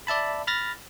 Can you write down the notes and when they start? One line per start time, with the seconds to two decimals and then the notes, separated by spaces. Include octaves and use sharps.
0.07 D5 E5 A5 B5
0.47 B5 F6 A6 A#6